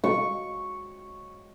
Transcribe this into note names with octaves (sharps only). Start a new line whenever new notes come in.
C#6